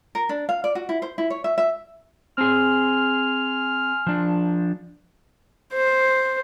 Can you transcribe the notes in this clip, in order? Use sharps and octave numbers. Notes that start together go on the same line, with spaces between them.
A#4
D4
F5
D5
F#4
E4
C5
E4
C#5
E5
E5
C4 G#4 G#5 C6 F6
F3 D4
C5